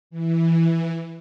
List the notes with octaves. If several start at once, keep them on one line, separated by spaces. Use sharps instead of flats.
E3